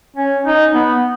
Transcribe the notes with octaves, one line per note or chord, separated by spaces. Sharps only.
C#4
D#4
B3